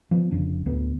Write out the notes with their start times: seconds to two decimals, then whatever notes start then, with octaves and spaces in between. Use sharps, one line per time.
0.11 F3 B3
0.31 F1 F2 C#3 D4
0.66 D1 D2 A3 B3